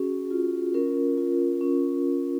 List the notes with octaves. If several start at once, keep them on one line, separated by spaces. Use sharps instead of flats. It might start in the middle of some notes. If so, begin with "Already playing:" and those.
Already playing: C#4 F#4 G#4
F4
C#4 A#4
F4
C#4